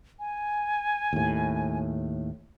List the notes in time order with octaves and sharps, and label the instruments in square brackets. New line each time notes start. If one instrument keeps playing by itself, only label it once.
[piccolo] G#5
[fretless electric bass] D#2 A2